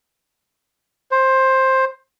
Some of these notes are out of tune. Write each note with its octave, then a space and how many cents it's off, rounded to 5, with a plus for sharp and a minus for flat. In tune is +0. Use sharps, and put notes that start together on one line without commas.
C5 +15